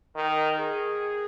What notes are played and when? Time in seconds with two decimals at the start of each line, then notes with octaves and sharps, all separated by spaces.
0.16 D#3 A#4
0.58 G#4